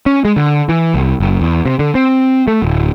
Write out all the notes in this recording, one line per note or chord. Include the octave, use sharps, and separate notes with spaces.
C#4
G#3
D3
E3
C2
F#1
E2
C3
D3
C4
A3
D1